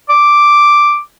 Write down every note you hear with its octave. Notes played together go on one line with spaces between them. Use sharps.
D6